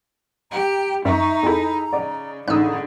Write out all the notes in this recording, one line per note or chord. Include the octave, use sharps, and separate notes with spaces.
G4 A#5
F#2 G3 D#4 E5 A#5 C#6
F2 E4 G#4 A4 B5
C#3 D5 D#5
A1 D3 D#4 G#4 D#6 E6 F#6